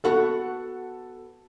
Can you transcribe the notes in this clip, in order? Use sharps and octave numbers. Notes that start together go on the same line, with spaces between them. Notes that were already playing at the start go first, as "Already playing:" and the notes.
B3 F#4 A4 F#5